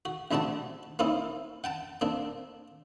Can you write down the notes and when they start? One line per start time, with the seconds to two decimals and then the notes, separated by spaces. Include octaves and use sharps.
0.05 F#4
0.31 A1 G3 C4 D4 F#4 A5
0.99 A#3 C4 C#4 D#4 E4
1.64 F#5 G5 A5
2.01 A#3 C4 D4